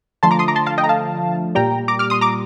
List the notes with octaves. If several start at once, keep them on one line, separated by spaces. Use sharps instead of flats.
D3 F3 A3 A5 C6
A#5 D6
C6 D#6
A#5 D6
A5 C6
F5 A5
D#5 G5
A#5
F5 A5
A#2 G3 G5 A#5
A#5 D6
D6 F6
C6 D#6
A#5 D6